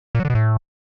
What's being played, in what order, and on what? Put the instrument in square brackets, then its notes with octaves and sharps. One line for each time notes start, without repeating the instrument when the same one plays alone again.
[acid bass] A#2
F#3
D3
B2
A2